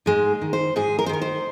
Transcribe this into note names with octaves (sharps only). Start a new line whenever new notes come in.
G#2 G#3
D#3
C5
G#2 G#4
A#4
C5
D#3 A#4
C5